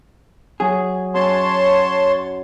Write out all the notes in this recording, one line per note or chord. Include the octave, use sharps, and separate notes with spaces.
F#3 G#4
F#2 C#5 A5 C6